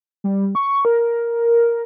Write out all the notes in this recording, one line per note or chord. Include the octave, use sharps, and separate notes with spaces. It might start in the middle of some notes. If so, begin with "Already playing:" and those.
G3
C#6
A#4